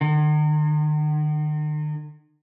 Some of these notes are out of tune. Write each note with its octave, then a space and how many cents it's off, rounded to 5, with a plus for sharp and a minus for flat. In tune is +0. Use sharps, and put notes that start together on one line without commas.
D#3 -45